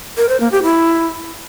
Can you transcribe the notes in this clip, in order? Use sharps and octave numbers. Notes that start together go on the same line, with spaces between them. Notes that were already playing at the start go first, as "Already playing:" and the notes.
A#4
C5
A#3
G4
E4